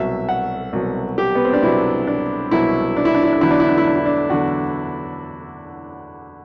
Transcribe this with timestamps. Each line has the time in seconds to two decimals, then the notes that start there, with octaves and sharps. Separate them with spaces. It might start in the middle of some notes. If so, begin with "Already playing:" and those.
Already playing: C2 B2 F#3 E5
0.29 F#5
0.73 C2 B2 F#3
1.18 G4
1.35 B3
1.45 C4
1.53 D4
1.63 C2 B2 F#3 E4
2.07 D4
2.51 C2 B2 F#3 E4
2.97 D4
3.05 E4
3.15 D4
3.23 E4
3.33 D4
3.41 E2 D3 F#3 E4
3.51 D4
3.60 E4
3.69 D4
3.78 E4
3.87 D4
3.96 E4
4.06 D4
4.30 E2 D3 F#3 F#4